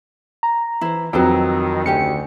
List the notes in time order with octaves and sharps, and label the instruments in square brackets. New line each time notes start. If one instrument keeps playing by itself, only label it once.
[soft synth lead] A#5
[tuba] E3 [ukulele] E4 C5
[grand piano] F2 F#3 [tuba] D#3 [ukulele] B4 C5 G5
[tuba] D2 [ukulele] C#4 G4 G#5 [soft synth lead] C#7